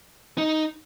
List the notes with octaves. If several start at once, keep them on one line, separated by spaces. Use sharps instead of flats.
D#4